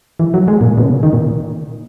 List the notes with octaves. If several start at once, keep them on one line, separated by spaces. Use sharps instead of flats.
E3
F#3
G#3
A#2
B2
C#3
D#3
A#2